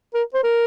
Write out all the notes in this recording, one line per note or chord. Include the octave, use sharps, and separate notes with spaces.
A#4
C5
A#4